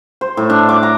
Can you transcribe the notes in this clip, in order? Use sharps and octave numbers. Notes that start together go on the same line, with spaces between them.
C5
A2
D4
D6
A#5